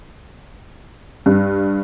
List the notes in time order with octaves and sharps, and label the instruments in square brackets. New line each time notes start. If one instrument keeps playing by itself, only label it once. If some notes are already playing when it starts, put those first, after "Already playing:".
[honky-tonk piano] G2